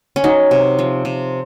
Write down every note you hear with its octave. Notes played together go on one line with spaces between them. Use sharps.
C#4
F#3 D#4
C3
F3
C3